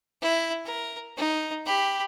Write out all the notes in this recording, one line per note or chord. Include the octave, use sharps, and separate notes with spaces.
E4
A#4
D#4
G4 B5